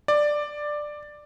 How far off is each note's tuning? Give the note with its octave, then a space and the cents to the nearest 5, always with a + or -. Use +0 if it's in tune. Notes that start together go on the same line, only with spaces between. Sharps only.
D5 +10